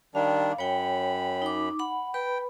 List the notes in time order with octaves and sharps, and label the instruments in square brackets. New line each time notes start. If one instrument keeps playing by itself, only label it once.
[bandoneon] D#3 G3 D4 [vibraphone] F5
[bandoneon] F#2 B5 [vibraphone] C#5 G5
[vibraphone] D#4 D6
F#5 B5
[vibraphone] B4 B5 [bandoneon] G5